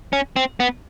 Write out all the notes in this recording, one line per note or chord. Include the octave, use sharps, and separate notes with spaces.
C#4
C4
B3